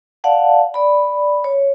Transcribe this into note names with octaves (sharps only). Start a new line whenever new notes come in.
D5 F5 F#5 A5
D5 B5
C#5